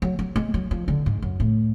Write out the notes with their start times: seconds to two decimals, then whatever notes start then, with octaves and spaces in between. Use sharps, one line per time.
0.02 F#3
0.19 F#3
0.36 G#3
0.54 F#3
0.71 F3
0.88 D3
1.06 G#2
1.22 F#2
1.40 A2